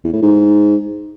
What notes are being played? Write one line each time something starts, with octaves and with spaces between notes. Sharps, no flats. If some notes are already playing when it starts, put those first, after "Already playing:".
E2
A2
G#2